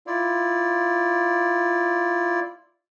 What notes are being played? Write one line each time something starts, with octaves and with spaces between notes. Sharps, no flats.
E4 F4 D5